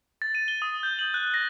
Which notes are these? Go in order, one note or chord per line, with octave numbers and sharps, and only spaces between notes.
A6
D#7
G7
D#6
G6
F#7
F#6
A#6